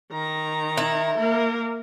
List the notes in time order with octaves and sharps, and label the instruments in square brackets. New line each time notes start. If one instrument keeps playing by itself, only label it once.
[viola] D#3 A#5
[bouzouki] E4
[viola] A#3 A#4